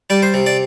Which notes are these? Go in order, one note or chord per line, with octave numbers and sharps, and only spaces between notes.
G3 D5
C5
C3
D5